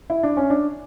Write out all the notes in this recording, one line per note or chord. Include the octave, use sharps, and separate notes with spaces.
E4
D4
C#4
D4